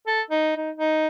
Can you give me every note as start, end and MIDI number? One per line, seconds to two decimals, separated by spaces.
0.07 0.21 69
0.31 0.53 63
0.57 0.70 63
0.77 1.07 63